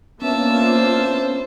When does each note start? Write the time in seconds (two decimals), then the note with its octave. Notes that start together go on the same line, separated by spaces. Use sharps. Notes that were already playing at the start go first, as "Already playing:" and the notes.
0.22 A#3 B3 C#4 D4 F4 E5 A5
0.63 C5